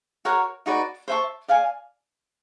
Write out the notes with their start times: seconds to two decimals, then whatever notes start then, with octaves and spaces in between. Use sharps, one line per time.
0.25 F#4 A#4 C#5 F#5
0.66 D#4 F#4 B4 D5
1.08 C5 E5 A5 C#6
1.48 D5 F5 G#5